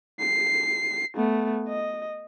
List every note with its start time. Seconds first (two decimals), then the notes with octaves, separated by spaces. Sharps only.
0.20 C7
1.16 A3 B3
1.69 D#5